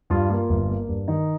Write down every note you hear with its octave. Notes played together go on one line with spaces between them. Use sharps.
G2 F4
A#3 F4
G1
A#3
G2
D#3 D#4